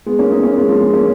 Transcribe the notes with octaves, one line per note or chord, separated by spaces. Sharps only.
G#3 B3
A#3 C#4
B3 D#4
A#3 C#4
G#3 B3
F3 G#3
G#3 B3
A#3 C#4